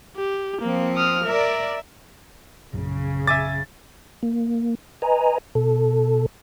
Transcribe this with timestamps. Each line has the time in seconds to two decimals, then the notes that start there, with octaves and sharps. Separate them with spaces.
0.16 G4
0.61 F3 A#3 C4
0.96 D#6 F6
1.26 A#4 D5 E5
2.73 A#1 F#2 C#3
3.27 E5 G#5 D6 A6
4.23 A#3
5.02 B4 D#5 G#5 A#5
5.55 B2 A4